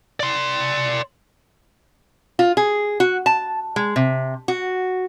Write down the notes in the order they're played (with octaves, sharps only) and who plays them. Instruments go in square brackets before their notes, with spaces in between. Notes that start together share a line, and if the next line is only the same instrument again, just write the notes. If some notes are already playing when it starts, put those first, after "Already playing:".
[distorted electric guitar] D5 C6
[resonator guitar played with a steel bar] F4
G#4
F#4
A5
G#3
C3
F#4